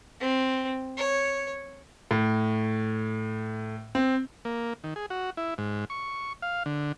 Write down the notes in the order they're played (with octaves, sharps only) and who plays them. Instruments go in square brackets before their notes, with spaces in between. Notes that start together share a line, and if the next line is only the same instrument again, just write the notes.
[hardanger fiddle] C4
C#5
[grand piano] A2
C4
[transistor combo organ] A#3
D#3
G#4
F#4
E4
G#2
C#6
F5
D3